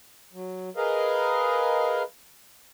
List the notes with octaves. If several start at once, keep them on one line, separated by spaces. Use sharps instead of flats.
F#3
G#4 A#4 B4 D#5 F5